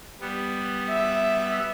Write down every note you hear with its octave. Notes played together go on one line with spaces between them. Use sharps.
G3 B3
E5